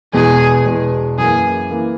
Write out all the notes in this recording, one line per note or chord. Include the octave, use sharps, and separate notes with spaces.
E2 B2 G#3 G#4
E2 B2 G#3
F#2 E3 A#3 G#4
E3 A#3